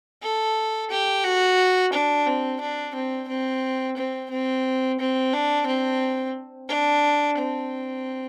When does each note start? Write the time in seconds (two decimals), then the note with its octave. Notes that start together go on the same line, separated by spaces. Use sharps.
0.23 A4
0.91 G4
1.24 F#4
1.93 D4
2.26 C4
2.61 D4
2.95 C4
3.28 C4
3.97 C4
4.30 C4
4.99 C4
5.33 D4
5.67 C4
6.69 D4
7.38 C4